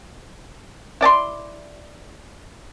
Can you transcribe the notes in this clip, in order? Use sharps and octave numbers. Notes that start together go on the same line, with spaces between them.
E4 D5 A5 C6